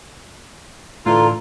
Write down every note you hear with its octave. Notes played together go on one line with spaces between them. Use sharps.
A2 D3 E3 F4 A4 A#5